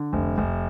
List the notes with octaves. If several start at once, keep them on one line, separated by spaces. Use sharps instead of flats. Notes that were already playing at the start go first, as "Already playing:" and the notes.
Already playing: D3
F1
F1